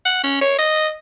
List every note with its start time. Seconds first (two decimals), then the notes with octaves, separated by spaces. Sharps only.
0.06 F#5
0.24 C#4
0.41 C#5
0.58 D#5